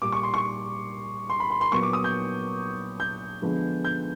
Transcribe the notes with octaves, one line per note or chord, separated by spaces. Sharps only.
A#2 G3 A#3 D6
C#6
C6
C#6
C6
B5
C6
C6
A#2 F#3 B3 C#6
D6
D#6
G6
G6
D3 F3 G#3 B3
G6